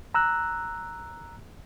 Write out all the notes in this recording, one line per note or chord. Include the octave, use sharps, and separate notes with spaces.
A#5 E6 F#6